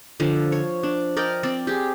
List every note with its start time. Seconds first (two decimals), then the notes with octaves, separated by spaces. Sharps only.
0.20 D3 F3
0.52 C#5
0.83 D4
1.17 A#4 D5 D#5 G5
1.43 C4 D5
1.67 G4 G#4